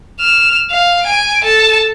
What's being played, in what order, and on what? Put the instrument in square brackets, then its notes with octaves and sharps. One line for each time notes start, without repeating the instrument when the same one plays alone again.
[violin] F6 E7
F5
G#5 D7
A4 A5